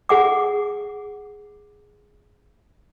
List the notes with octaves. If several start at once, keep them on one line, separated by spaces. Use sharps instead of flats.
G#4 F#5 D6